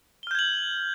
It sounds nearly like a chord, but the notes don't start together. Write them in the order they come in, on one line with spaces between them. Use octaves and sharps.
G7 F6 G6 G#6 F#7